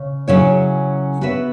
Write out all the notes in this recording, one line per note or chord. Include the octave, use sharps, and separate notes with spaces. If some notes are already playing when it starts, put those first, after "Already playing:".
Already playing: C#3
C#3 F#3 C#4 E4 C#5
B3 F#4 B4 E5